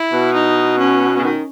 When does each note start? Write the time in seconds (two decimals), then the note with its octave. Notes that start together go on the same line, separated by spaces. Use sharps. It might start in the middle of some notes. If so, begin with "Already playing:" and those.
Already playing: E4
0.12 B2
0.34 D#4
0.79 C#4
1.18 C#3
1.23 D#3